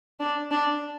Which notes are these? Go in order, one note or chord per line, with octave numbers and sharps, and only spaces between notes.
D4
D4